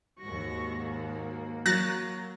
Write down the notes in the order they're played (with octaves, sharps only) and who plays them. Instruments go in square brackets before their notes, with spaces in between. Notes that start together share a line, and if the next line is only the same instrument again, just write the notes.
[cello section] D#2 G#2 F#4 [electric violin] C#6 A#6
[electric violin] A#3
[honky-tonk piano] F#3 [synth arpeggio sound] F#6 A6 A#6